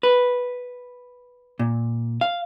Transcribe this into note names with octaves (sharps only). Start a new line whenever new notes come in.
B4
A#2
F5